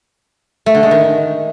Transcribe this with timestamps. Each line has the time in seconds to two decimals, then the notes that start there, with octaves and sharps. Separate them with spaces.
0.66 A3
0.75 D3
0.83 G#3
0.91 D#3